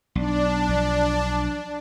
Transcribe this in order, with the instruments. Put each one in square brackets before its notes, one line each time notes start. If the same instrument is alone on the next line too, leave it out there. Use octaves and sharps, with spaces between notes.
[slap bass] B1 [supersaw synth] D4
[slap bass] B1 F3